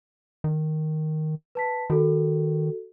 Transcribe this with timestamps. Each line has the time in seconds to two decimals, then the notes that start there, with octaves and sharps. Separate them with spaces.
0.44 D#3
1.55 B4 A5 B6
1.90 D#3 F#4 A4